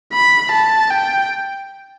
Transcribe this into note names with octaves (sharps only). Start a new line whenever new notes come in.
B5
A5
G5